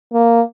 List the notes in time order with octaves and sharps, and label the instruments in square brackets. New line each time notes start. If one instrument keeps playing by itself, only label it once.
[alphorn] A#3